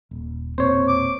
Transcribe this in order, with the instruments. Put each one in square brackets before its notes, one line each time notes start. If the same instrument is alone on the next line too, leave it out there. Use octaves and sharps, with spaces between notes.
[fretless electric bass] D#1
[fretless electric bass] E1 A#2 C4 [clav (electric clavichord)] C5 C#5
[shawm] D6